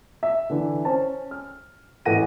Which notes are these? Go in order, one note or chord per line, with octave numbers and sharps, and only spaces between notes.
E5
D3 E3
C#4 C5 A5
F6
A1 E3 A4 F#5 A#6 D#7